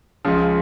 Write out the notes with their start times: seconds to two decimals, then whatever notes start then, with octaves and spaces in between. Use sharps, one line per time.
0.25 C#2 C#3 F3